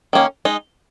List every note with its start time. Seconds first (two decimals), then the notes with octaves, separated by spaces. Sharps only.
0.13 D#3 A#3 C#4
0.45 G#3 D#4